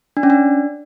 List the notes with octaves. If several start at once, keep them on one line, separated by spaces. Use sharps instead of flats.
D4
C#4
D4